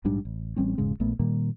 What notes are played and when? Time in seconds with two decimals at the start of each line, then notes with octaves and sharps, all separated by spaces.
0.04 A#1 G#2 G3 D4
0.25 A1
0.56 A1 G3 C4 C#4
0.78 E1 G#2 C#3 G#3
1.00 A#1 A#2 A3 B3
1.20 A#2 D#3 G3 A#3